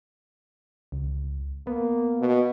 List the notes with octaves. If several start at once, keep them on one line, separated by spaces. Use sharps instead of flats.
C#2
A#3 B3
B2